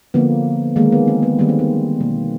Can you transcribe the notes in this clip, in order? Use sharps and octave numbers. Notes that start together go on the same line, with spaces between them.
D3 F3 A#3 B3
D#3 G#3 A#3
B3
C4
B3
D#3 G3 A#3 B3
C4
B3
B2 F#3 A#3 B3